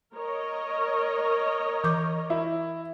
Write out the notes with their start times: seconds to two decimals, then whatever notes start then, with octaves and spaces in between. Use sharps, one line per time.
0.14 A#4 C#5 D#5
1.84 E3 D6 G6
2.30 E4